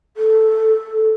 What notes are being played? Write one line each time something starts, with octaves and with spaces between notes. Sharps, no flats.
A4